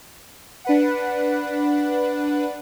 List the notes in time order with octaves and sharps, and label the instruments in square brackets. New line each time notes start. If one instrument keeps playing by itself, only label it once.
[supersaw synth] D4 B4 F#5